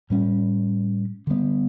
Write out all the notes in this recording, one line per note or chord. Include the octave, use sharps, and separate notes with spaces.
A2 G3 C#4
D3 G3 B3